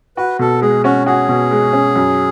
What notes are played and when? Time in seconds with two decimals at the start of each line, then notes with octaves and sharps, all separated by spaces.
0.17 F#4 B4
0.39 B2 A4
0.62 G#3 G#4
0.83 C#4 F#4
1.06 F#4 G#4
1.29 B2
1.51 G#3
1.73 C#4
1.96 F#2